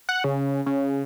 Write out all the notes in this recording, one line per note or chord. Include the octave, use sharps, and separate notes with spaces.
F#5
C#3
C#3